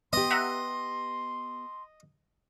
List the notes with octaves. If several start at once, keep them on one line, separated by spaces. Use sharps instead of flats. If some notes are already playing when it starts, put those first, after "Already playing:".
B3 G4 D#5 C6
E5 F#5 A#5